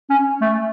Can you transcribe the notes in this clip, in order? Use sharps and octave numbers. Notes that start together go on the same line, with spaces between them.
C#4
A3